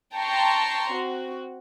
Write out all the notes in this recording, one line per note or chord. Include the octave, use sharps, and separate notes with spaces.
G5 A5 A#5 C6 C#6
C4 F#4